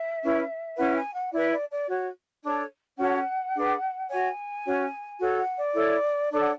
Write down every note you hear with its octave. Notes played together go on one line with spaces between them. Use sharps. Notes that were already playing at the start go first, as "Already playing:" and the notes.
Already playing: E5
C#4 E4 B4
C#4 E4 B4 F#5
G#5
F#5
E4 B4 D5
D5
D5
F#4 C#5
D4 A4 C#5
C#4 F#4 A4 C#5 F#5
D4 G#4 B4
F#4 C#5 G#5
C#4 F#4 C#5
F#4 A4 C#5
F#5
D5
E4 A4 C#5
D4 A4 C#5 D5
F#5